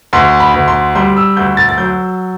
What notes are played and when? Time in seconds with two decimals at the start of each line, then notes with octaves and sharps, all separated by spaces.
0.13 D2 C6
0.40 B5
0.54 D2
0.68 C6
0.95 G3 C6
1.17 E6
1.37 D2 G6
1.57 A6
1.69 A6
1.78 F#3 G6